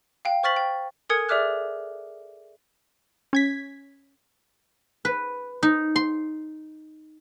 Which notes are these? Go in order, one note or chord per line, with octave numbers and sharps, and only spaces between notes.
F5 G5
C5 C#6 F6 A6 B6 F#7
G5
A4 A#4 G#5 D#6 G#6 C#7
G#4 D5 E5 D6 F6 F#6
C#4 G#6 B6
B4
D#4
C6